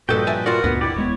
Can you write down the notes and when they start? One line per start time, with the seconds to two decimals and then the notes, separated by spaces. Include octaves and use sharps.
0.09 G2 A#2 F3 F#4 A4 B4 D#5 G5
0.27 E5 G#5 A5
0.46 F4 F#4 A#4 B4 D5
0.64 D2 G2 A#2 B3 B4 F#5
0.81 E4 G4 D5
0.96 E1 G#3 B3 C#5